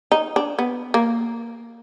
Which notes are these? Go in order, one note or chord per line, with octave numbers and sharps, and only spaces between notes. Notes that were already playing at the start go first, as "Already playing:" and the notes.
D#4
D4
B3
A#3